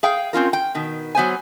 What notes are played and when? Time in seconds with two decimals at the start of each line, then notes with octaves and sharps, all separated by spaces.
0.03 G#4 F5 G5
0.33 C4 C#4 F4 A#4
0.53 G5
0.75 B2 D#3
1.15 F#3 B3 C5 G#5